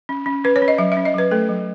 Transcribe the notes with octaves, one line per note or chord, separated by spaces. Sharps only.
C#4
C#4
C#4 B4
C#5
C#4
D#5
F#3 E5
E5
C#4
D#5
F#3 B4
A3 A4
F#3